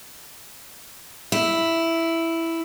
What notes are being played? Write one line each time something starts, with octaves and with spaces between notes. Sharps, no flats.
E4